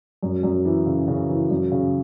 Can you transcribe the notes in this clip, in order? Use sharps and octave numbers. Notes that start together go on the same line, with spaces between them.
F#2
F#2
E3
C#3
C#3
E3
F#2
C#3